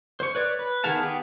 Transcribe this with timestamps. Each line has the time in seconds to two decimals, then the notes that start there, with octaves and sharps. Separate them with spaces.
0.20 C5 C#6
0.35 B4 C#5 D5
0.59 B4
0.84 D#3 B3 G#4 F5 A5
1.02 B3 G4 G#4